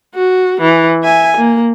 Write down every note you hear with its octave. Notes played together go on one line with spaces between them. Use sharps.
F#4
E3
E5 G#5
A#3